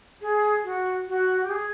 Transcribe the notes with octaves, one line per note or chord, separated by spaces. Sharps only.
G#4
F#4
F#4
G4
G#4